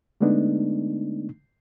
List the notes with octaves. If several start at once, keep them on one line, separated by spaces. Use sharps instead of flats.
D3 G#3 A3 B3 D4 D#4